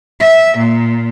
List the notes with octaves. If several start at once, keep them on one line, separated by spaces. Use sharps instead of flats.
E5
A#2